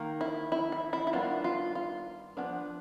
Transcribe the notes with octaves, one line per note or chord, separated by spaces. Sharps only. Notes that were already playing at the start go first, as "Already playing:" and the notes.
Already playing: D#3 A#3
E4
E4
E4
E4
E4
D#3 G3 B3 D4 F4
F4
F4
F3 G#3 B3 D4